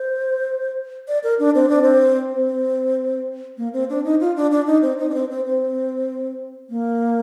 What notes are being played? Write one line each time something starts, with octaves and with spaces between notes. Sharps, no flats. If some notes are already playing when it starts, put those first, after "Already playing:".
Already playing: C5
D5
A#4
D4
C4
D4
C4
C4
A#3
C4
D4
D#4
F4
D4
D4
D#4
C4
D#4
D4
C4
C4
C4
A#3